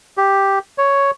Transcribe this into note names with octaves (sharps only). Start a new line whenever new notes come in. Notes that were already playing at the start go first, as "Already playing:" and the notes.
G4
C#5